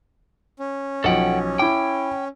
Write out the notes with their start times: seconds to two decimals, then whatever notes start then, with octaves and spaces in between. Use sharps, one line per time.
0.59 C#4
1.04 B1 F3 A4 F#5 G5
1.59 E4 G5 D6